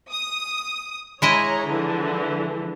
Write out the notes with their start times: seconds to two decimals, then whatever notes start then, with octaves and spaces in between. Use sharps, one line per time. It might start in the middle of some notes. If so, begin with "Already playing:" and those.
0.11 D#6
1.22 G#3 E4 C#5 D#5 A#5
1.66 D3 E3 F3